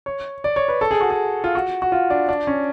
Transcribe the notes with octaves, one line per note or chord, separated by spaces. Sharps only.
C#5
D5
C#5
B4
A4
G#4
F#4
G#4
F4
F#4
F#4
F4
D4
D4
C#4